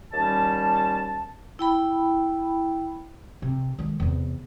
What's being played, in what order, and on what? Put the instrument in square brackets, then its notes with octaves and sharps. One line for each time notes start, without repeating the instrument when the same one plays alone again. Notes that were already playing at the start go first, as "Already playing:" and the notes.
[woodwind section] D#2 G3 C#4 A5
[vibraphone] E4 G5 B5
[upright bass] C3
D#3 G#3
E2 C3